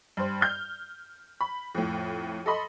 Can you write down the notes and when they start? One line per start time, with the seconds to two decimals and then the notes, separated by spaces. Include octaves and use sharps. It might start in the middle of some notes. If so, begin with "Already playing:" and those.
0.17 G2 C5
0.41 F6 G6
1.41 B5
1.75 F2 A2
2.46 A4 D#5 B5 C6